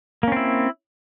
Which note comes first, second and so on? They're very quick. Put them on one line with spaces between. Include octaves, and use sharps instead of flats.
A#3 C#4 C4 E4